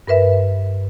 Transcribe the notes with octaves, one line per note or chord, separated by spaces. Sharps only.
G2 A#4 B4 E5